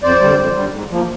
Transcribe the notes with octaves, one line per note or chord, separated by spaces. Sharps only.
F2 C5 D5
D3 G3
F2
D3 G3
G#2
F3 A#3